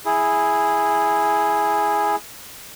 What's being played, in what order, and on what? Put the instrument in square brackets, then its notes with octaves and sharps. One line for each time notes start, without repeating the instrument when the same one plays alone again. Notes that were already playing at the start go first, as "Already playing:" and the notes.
[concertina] E4 G#4